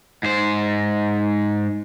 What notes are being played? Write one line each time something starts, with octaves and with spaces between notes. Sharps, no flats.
G#2 C5